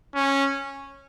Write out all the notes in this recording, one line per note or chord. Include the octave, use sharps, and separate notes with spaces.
C#4